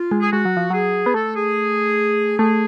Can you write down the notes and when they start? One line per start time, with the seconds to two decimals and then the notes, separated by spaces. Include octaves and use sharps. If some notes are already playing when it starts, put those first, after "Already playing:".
Already playing: F4
0.11 G#3
0.21 G#4
0.32 G#3 F#4
0.45 F#3
0.57 F3
0.70 F#3 G#4
1.06 B3
1.14 A3 A4
1.35 G#4
2.38 A3 G#4